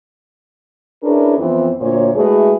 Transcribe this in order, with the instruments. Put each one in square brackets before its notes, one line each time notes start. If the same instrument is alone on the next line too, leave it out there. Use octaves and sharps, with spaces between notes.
[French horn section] C#4 D4 E4 G#4 A#4 B4
F2 E3 B3 C4
D2 A#2 A#3 C5 C#5
G#3 A3 E4 F#4 G#4 B4